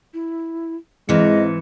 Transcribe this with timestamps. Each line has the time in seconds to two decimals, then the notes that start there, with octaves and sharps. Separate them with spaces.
0.14 E4
1.09 G#2 E3 G#3 C4 E4 D#5 C#7